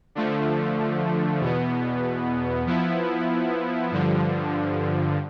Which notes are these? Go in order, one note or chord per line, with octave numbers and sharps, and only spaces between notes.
D3 F3 A3
E2 B2 B3
F3 B3 E4
G2 D3 F3